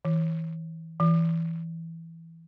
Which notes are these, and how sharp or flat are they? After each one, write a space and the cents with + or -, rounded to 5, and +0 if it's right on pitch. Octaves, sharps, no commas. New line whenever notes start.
E3 -20
E3 +0